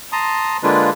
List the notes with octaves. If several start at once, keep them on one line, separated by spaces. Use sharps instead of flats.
A5 A#5 C6 D#6
D3 G#3 A#3 D4 F4 B4